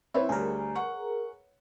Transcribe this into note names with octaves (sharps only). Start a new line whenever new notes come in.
C4 E4 B4 C#5 E5
D2 G3 G#4 A#4
F#5 C#6